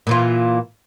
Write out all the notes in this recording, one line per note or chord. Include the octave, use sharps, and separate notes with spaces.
A#2 E3 F4